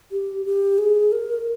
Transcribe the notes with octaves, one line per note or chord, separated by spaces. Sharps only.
G4
G4
G#4
A#4